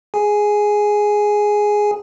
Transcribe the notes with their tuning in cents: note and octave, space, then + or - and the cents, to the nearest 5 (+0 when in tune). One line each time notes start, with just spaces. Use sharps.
G#4 +0 G#5 +5